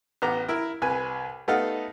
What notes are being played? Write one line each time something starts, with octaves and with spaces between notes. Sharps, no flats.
A1 B3 A#5 D6
E4 A#4
C2 B4 G#5
A3 B3 D#4 A4 F5 F#5